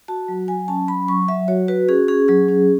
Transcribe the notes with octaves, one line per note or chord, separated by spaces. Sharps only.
F#4 A5
F#3
F#3 G#5
C#4 A5
F#3 B5
F#3 C#6
F#3 E5
F#4 C#5
F#4 B4
C#4 G#4
C#4 G#4
F#3 G#4
C#4